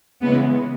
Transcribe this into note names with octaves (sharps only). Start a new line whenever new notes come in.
C#3 E3 G#3 B3